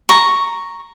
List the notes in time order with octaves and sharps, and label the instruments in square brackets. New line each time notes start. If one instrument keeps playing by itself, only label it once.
[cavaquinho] A#5 C#6